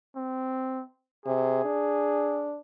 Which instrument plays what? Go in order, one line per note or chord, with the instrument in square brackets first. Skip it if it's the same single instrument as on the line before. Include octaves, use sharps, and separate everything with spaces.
[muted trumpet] C4
[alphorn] C3 [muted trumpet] G#4
[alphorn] D4